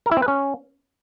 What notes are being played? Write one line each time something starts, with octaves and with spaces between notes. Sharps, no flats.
A#4
E4
C4
B4
C#4